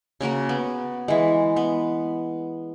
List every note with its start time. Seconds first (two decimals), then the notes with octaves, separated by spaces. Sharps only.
0.21 C#3 A#3 F#4 A#4
0.49 B3
1.08 E3 G#3
1.56 B3